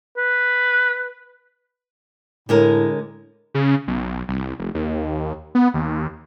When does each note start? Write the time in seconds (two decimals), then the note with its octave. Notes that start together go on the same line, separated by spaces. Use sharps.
0.17 B4
2.49 A2 D3 G#3 A#4
3.54 C#3
3.87 B1
4.28 C2
4.59 F1
4.74 D#2
5.55 B3
5.74 D#2